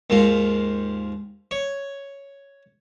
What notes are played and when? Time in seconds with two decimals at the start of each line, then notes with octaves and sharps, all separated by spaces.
0.10 D#2 G#2 F4
1.51 C#5